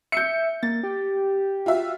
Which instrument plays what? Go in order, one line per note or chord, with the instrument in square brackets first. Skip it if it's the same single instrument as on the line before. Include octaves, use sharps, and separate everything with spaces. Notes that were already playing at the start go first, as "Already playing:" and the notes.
[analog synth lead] E5 [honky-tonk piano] G6 C#7
[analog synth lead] A#3 [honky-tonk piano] A6
[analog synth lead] G4
[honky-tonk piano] F4 F#4 E5